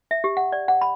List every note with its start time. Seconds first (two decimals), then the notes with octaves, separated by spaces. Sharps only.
0.11 E5
0.24 G4
0.37 F#5
0.52 D5
0.68 F#5
0.81 B5